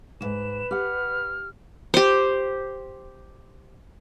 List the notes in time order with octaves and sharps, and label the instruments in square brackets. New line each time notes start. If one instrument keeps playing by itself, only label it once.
[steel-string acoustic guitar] D2 G#2 [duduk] B4 [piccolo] E7
[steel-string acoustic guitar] G4 F#5 [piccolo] F6
[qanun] G4 C5